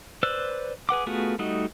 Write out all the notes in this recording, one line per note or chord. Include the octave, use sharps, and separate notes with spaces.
B4 C5 D5 E6 F#6
G#4 B4 F#5 D6
A3 B3 F4 F#4 G#4
G3 A3 D#4 F#4 D#5